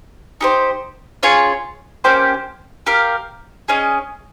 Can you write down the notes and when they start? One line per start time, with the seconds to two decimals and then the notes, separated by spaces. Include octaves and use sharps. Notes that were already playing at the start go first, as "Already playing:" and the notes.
0.41 D#4 G4 C5
1.23 C#4 F4 G#4 C#5
2.04 A#3 C#4 G4 C5
2.86 G4 A#4 F5
3.68 C#4 G#4 D#5